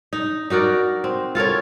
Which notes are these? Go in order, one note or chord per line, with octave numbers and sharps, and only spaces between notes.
D#4
D#4 F#4 A#4 D5
C4
F4 A4 A#4 C#5